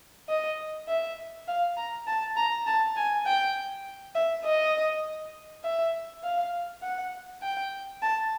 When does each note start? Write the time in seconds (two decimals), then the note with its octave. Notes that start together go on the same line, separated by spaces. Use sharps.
0.29 D#5
0.88 E5
1.48 F5
1.77 A#5
2.07 A5
2.36 A#5
2.67 A5
2.97 G#5
3.26 G5
4.15 E5
4.45 D#5
5.64 E5
6.23 F5
6.83 F#5
7.42 G5
8.02 A5